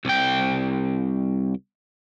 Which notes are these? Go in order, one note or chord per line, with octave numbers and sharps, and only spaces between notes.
C2 G5